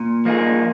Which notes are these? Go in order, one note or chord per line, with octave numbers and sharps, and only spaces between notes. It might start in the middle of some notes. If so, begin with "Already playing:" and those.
Already playing: A#2
F3 A#3 D#4 G#4